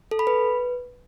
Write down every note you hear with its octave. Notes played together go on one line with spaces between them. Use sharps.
A4
B5
B4